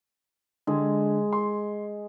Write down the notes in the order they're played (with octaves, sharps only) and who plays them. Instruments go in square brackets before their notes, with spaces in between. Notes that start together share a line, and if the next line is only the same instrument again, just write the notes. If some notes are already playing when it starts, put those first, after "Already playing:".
[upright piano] D3 [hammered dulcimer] G#3
[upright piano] C6